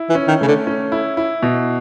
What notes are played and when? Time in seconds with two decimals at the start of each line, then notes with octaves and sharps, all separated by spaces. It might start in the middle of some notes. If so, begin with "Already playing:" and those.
Already playing: E4
0.09 E3
0.15 C#4
0.28 D#3
0.41 C#3 A3
0.48 D3
0.67 C#4
0.92 E4
1.17 E4
1.42 B2